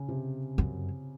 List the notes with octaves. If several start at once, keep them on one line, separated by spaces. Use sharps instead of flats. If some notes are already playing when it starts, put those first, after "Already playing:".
Already playing: C#3
C3
F#2